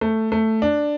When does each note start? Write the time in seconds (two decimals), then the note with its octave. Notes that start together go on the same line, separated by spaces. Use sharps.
0.01 A3
0.32 A3
0.62 D4